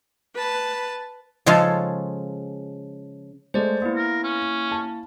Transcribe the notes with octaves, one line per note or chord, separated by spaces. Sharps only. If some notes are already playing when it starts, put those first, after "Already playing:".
B4 A5
C#3 F3 G#3 C#4 F4 A4
G#3 A3 C5 D5
A#3 B3 E4
A#4
C#4
A5